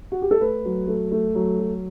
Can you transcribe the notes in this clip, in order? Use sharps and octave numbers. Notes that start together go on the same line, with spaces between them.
F#4
G4
A4
A3 B4
F#3
A3
A3
F#3
F#3